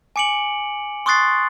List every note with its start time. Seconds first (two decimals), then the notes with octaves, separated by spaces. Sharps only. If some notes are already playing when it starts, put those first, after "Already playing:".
0.16 G#5 D6 C#7 D7 F#7
1.06 C6 C#6 D#6 F#6 A6 C7